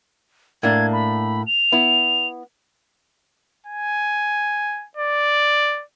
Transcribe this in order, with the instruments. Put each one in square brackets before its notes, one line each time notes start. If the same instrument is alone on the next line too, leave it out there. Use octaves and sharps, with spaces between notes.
[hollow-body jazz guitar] A2 A#3 D4 [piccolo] G#6
[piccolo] B5
F7
[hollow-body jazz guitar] B3 E4
[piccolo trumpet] G#5
D5